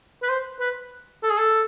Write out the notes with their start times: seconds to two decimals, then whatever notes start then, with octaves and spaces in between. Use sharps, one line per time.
0.22 B4
0.29 C5
0.60 B4
1.23 A4
1.30 G#4
1.38 A4